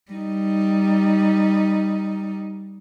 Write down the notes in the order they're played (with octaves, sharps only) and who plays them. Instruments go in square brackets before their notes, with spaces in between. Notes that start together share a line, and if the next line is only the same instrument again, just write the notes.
[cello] G3 D#4